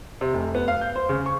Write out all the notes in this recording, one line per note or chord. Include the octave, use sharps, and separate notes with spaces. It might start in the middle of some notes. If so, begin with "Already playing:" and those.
C3
F1
B3
F5
G6
C5
C#3
C#6